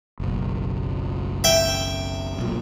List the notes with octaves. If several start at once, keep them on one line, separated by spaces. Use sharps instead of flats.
F#1 B1
E5 G5
B1 A#2